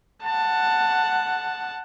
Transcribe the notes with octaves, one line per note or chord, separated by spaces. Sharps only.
F#5 A5